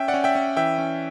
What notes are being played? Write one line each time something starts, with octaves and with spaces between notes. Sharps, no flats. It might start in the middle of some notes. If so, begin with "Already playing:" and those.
Already playing: C#4 E5 G5
D5 F#5
C#4
E5 G5
C#4
E3 E5 G5
C#4